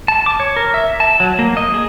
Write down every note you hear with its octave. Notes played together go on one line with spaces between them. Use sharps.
A5
D6
C#5
A#4
E5
A5
F#3
A#3
D#5
G#4